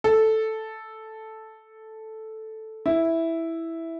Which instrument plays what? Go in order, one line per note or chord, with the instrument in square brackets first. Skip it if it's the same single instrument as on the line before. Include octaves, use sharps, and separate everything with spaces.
[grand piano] A4
E4